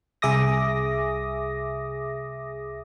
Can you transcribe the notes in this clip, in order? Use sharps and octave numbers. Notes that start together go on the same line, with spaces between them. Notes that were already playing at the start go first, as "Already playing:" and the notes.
C2 G#4 E5 D6 D#6 A#6